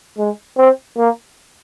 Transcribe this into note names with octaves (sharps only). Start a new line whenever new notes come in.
G#3
C4
A#3